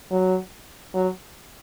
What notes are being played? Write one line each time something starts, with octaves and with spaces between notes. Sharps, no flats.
F#3
F#3